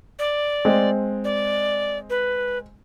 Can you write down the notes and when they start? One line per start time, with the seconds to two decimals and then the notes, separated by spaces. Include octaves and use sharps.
0.19 D5
0.65 G#3 C4
1.24 D5
2.10 B4